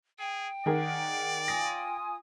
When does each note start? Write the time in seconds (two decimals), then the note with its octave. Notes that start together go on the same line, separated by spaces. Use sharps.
0.19 G#4 G5
0.66 D#3 G#4 A#4 D5 F#5
1.48 F4 G#5 D#6 A#6